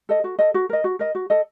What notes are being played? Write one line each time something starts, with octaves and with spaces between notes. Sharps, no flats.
A4 D#5
F#4
A4 D#5
F#4
A#4 D#5
F#4
A#4 D#5
F#4
A4 D#5